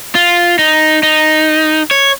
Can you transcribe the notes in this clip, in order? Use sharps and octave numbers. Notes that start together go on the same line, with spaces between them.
F4
D#4
D#4
C#5